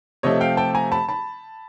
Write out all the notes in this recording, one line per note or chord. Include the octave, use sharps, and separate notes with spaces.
C3 F3 A3 C#5 D#5
F5 G5
G5 A5
G#5 A#5
A5 B5
A5 B5